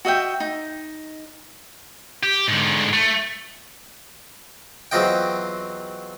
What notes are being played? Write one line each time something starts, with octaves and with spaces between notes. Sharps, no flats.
F#4 D#5 E5 G5
D#4
G4
G#2 D3
A3
E2 F#3 C4 F4 D#5 G5